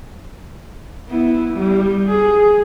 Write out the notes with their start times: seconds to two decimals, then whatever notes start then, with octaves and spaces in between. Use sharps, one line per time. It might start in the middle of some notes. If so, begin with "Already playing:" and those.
1.09 B3 E4
1.54 G3
2.09 G#4